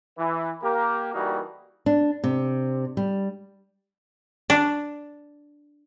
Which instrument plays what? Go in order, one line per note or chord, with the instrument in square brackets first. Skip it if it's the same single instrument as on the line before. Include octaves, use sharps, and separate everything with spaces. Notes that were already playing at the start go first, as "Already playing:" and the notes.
[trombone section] E3
A#3 G4 A#4
E3 G3 A3 A#3 D#4 F#4
[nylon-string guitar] D4
C3
G3
[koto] D4